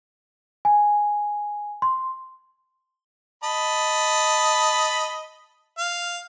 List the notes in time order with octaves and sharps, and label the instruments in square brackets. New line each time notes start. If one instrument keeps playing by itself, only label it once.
[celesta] G#5
C6
[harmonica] D#5 A5 B5
F5